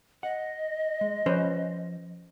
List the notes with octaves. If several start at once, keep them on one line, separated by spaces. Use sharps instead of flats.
D#5 F#5
G#3
F3 C#4 B4 C5